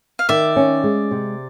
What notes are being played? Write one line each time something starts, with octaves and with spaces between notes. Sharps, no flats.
F5
D#3 D5 E5
C#4
G#3
C3